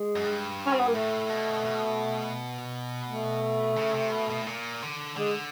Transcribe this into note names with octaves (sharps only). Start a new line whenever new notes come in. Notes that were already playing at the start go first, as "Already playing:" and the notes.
Already playing: G#3
F#2
G2
C#4
C4
B3
A#3
A2 A3
B2
B2
A3
C#3
C3
B2
B2
A2
A#2
D3
D3 G#3